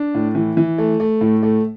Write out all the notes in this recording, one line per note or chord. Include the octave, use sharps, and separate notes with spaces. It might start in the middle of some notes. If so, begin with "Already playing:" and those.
Already playing: D4
A2
E3
E3
A3
A3
A2
A3